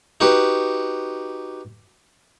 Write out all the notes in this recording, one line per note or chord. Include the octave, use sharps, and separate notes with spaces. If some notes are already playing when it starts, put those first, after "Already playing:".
D#4 F#4 G4 B4